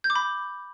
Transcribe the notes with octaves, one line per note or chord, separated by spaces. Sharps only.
G6
D6
B5